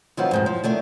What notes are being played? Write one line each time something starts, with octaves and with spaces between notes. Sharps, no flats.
D#3 F3 F#3 B3 C4 F4
F2 G#2 B2
F3
D#3 A3 D4